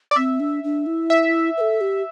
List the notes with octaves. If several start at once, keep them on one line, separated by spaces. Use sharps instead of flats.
D5
C4 E5
D4
D4
E4
E5
B4
A4
G4